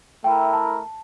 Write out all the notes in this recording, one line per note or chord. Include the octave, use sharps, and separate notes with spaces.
A3 E4 A#4 G5
A5